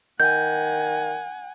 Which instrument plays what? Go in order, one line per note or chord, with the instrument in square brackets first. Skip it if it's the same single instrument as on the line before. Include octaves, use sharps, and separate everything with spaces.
[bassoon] D#3 [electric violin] F#5 G#5 [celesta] G6